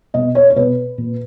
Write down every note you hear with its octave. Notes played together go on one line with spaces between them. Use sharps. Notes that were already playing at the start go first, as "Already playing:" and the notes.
B2 D#5
C#5
C#5
B2 B4
A#2